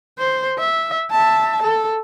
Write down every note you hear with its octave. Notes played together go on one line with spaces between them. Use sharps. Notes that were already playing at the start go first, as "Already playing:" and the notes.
C5
E5
E5 A5
A4